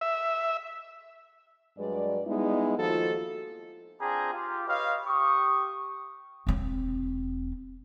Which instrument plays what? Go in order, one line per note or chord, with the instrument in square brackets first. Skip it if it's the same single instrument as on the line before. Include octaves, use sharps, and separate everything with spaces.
[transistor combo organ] E5
[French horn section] G2 F#3 G#3 B4 D5
G3 G#3 B3 D#4 E4
D#2 F3 D#4 F4 F#4 A4
[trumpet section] C4 D4 F4 G#4 G5 A#5
F4 G4
B4 C#5 D#5 F5
G4 C#6 D#6
[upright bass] E1 C4